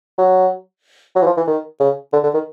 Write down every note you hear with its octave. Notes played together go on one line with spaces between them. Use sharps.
F#3
F#3
E3
F3
E3
D#3
C#3
D3
D3
D#3